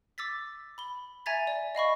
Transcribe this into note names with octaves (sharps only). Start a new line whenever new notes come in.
D6 E6 A6 B6
B5 G7
E5 G#5 A#5 G#6 A6 B6
D5
D#5 F5 B5 C#6